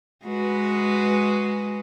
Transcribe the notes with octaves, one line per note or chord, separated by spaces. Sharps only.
G#3 F#4 B4